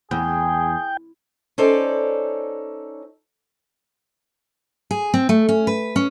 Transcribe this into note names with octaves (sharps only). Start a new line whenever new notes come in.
E2 G#4 G5
C#4 D#4 A4 C5 D5
G#4
C4
A3
C#4
B4
C#4